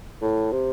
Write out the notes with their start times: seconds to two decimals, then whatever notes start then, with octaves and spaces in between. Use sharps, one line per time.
0.22 A2
0.52 C3